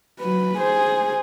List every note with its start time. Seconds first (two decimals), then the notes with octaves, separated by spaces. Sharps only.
0.20 F#3 B4
0.58 G#4 C5